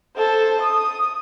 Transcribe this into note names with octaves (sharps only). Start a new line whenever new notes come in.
A4 C5
D#6